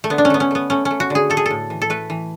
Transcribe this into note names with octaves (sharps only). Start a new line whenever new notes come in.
A3
D3 B3
D4
C#4
A3 B3
C#4
A3 B3
A3 C#4
C#4
A3
F#4
D3 G#4
A3 A4
G#4
A2 A4
E3
A4
A3 B4
E3